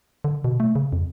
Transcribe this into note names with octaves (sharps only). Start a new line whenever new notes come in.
D3
B2
A3
C#3
F2